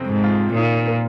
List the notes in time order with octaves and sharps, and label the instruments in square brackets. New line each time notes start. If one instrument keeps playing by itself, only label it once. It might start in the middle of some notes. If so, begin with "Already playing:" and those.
Already playing: [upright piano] F2 C3 C4
[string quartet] G#2
[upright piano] F4
[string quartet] A#2 [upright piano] D#3
[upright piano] A#3